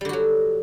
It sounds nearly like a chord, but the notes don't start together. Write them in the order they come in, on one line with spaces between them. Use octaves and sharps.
G3 D3 F#4 F#3